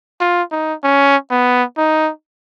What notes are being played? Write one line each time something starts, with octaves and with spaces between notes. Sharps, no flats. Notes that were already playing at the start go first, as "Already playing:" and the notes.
F4
D#4
C#4
B3
D#4